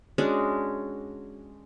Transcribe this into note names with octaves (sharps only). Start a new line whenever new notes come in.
G#3 C#4 D4 F#4